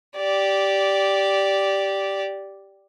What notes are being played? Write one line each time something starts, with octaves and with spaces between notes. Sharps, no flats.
G4 D5